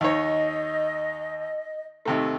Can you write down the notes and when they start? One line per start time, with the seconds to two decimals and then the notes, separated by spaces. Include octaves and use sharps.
0.01 D#2 D#4 C#5 D#5
2.05 D#2 C3 A3